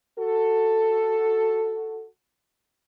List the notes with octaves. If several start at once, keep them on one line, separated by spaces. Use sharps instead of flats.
F#4 A4